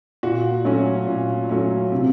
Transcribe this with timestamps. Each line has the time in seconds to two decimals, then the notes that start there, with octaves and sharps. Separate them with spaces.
0.23 A#2 F#4
0.65 F#3 A3 C#4
1.07 A#2
1.49 F#3 A3 C#4
1.92 C3